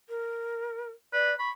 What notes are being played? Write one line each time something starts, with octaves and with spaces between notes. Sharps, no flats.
A#4
B4 D5
B5 C#6